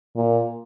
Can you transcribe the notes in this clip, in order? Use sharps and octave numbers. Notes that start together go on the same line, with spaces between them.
A#2